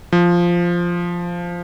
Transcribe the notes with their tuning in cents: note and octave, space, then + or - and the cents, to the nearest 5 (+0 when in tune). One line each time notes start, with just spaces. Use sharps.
F3 -5